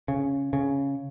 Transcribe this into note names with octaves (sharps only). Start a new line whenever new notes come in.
C#3
C#3